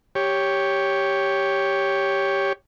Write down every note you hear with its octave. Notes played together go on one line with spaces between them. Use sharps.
G4 C#5